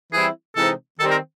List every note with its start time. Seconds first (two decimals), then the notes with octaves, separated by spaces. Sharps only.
0.13 E3 G3 C4 E4 G#4
0.56 C3 E3 G#3 C4 D#4 A4
1.00 D#3 G3 C4 A4
1.11 A#4